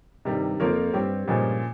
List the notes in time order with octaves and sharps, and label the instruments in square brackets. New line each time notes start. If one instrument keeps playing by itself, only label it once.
[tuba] G2 [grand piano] C3 D#3 G3
[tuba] F2 [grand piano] F3 A#3 F4 A#4 C#5
[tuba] G2 [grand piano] G3 C4 G4 C#5
[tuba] G2 [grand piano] A#2 F3 G#3 C#4